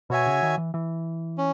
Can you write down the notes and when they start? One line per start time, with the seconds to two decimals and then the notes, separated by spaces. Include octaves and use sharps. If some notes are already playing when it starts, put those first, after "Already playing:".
0.10 B2 F#4 C#5 E5 G#5
0.26 C#3
0.43 D#3
0.58 E3
0.74 E3
1.38 C#4